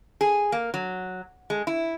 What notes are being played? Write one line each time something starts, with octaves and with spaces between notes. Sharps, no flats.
G#4
A#3
F#3
G#3
E4